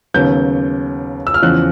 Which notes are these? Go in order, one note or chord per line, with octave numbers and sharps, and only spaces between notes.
D#2 C#3 F#3 B3 G6
E6
F6
E2 C#3 F3 F#6